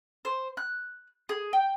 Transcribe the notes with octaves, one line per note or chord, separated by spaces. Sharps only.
C5
F#6
G#4
G5